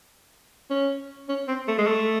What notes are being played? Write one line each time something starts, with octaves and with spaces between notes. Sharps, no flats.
C#4
C#4
C4
A3
G#3
A3